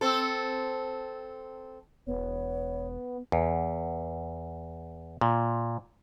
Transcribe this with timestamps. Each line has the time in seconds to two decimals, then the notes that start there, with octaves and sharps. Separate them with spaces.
0.01 C4 A4
2.07 E1 B3 C#5
3.32 E2
5.21 A#2